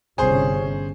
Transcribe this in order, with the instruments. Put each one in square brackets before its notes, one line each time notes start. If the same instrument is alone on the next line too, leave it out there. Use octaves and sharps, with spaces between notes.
[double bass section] G1 C3 C#4 [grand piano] G#4 C5